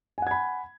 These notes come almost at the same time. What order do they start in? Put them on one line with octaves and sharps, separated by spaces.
G#5 F#5 G#6 B5